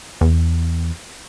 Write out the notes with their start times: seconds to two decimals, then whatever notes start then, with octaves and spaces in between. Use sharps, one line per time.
0.21 E2